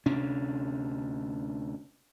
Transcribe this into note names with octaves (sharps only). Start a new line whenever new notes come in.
D2 C3 C#4 D4